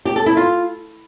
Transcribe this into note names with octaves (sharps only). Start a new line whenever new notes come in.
G4
A4
E4
F4